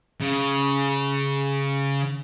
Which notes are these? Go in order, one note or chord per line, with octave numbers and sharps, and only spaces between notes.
C#3